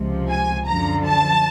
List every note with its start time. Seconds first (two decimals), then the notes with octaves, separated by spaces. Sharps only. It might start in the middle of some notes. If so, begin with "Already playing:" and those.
Already playing: C#2 C3 F3
0.29 G#5
0.67 F#2 D3 F3 A#5
1.05 A5